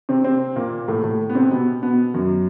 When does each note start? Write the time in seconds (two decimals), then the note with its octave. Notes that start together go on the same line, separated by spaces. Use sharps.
0.09 C3 C4
0.24 C3 C4
0.56 A#2 A#3
0.88 A2 A3
1.04 A2 A3
1.30 B3
1.35 C3 C4
1.51 B2 B3
1.83 B2 B3
2.14 F#2 F#3